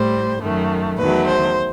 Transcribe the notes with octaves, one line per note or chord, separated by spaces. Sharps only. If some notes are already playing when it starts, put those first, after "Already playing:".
Already playing: A2 G3 C5
F#2 D#3 A3
E2 D#3 F#3 A3 B4
C5